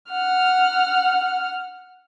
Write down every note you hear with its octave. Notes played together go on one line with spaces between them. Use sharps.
F#5 F6